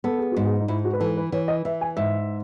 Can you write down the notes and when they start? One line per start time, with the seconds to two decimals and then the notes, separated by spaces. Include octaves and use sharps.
0.04 B3 A4
0.18 G#4
0.32 G#2 F#4
0.45 G#4
0.60 D#4
0.68 G#2 E4
0.85 F#4
0.93 B4
1.00 E3 A4
1.17 B4
1.32 E3 C#5
1.48 D#5
1.65 E3 E5
1.81 G#5
1.97 G#2 E5